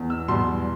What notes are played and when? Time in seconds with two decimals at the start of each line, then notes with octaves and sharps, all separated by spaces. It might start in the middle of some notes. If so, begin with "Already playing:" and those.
Already playing: E2
0.10 E6
0.28 E2 B2 G3 C6